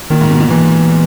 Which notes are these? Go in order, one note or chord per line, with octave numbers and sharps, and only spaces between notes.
A#2 D#3
G#2
B2
A#2
A#2 E3